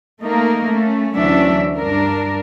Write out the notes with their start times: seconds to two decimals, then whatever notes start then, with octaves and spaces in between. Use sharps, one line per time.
0.21 A3 A#3 D#4 A#4
0.68 A3 C#4
1.16 D2 E3 F#3 C#4 D4 E5
1.76 G2 D4 A#4